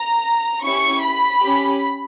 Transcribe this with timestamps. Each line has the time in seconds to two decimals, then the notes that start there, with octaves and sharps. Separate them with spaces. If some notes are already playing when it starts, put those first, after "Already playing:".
Already playing: A#5
0.65 C#4 E4 G4 C#6
1.04 B5
1.43 C#4 G4